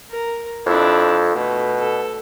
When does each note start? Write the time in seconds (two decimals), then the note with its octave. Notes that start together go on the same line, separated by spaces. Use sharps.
0.10 A#4
0.66 F2 D4 E4
1.35 B2 A3
1.78 A4